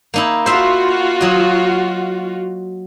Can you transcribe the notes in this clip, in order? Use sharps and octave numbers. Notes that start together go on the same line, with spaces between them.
A#3 D#4 E4
F4 F#4 C5 E5
F#3 D#5